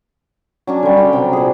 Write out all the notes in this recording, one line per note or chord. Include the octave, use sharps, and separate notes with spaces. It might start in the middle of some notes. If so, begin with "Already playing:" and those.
F#3 C#4 D4
D3 G3
G5
C3 F#3
A#2 G#4